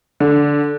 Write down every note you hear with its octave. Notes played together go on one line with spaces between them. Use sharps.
D3